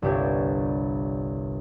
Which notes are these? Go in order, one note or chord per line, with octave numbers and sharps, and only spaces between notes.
G1 C2 D4 G4 C#5 G#5